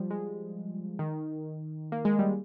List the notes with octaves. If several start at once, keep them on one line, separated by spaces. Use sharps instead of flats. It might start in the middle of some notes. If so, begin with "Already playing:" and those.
Already playing: F3 G3
G#3
D#3
A#3
G#3
G3